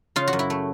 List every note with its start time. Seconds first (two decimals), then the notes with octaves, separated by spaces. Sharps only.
0.16 C#3 F4
0.28 F#4
0.33 F#2
0.39 E4
0.50 A3